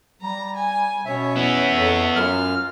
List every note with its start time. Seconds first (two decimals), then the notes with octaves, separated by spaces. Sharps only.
0.22 G3 A#5
0.56 G#5
1.06 B2 C#4 C#5 E5
1.36 B3 E4
1.75 F2 A4 C#5
2.16 F#2 F#3 F4 F6